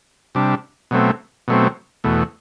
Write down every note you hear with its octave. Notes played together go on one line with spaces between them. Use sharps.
C3 G3 D4
B2 F#3 A3 C4
B2 F#3 A3 C4
E2 B2 A3